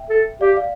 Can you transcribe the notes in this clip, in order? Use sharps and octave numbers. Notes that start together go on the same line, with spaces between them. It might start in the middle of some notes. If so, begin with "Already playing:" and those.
Already playing: E5 G5
A4
G4 D5 F5
D5 F5